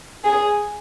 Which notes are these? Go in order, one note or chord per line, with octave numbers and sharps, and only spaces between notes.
G#4